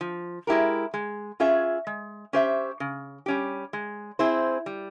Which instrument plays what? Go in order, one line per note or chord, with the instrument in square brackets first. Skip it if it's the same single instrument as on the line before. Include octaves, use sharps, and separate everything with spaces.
[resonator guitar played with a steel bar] F3
G#3 E4 G4 A#4
G#3
C#4 F4 G#4 E5
G#3
C#4 G4 C5 E5
C#3
G3 C#4 G4
G#3
C4 E4 G#4 C5
G3